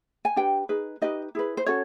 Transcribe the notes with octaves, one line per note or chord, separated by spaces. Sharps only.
G#5
D4 G4 B4 G5
D#4 G#4 B4
D#4 G4 B4 D#5
E4 G#4 B4
C5
C#4 F#4 A4 C#5